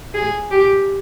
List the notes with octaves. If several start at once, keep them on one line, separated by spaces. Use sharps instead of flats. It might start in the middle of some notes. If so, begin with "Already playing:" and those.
G#4
G4